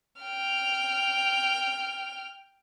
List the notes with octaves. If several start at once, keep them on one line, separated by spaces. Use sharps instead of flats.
G5 F6